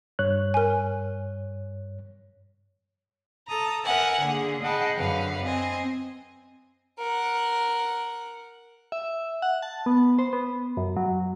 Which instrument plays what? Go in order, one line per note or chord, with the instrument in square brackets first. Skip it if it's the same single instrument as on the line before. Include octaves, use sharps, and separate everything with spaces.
[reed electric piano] G2 C#5 F#6
[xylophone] A#4 G#5
[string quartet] A4 A5 A#5 D#6
A#4 B4 E5 F#5 G#5
D3 A#3 G#4
G#4 D#5 F#5 G5 A5 B5
F#2 D3 B4 F5 F#5
C4 D#5 G#5
[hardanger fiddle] A#4 F#5
[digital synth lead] E5
F#5
A5
B3
C5
B3
F#2
F#3